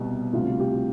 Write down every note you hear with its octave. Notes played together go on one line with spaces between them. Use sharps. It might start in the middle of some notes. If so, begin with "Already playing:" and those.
Already playing: C2 B2 G3
D2 C3 G3 F4
G4